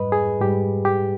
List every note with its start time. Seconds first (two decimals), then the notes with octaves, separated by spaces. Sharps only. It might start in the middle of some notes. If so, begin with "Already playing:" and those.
Already playing: G#2 G3 B4 D#5
0.12 G#4
0.41 G#2 G3 G4
0.85 G4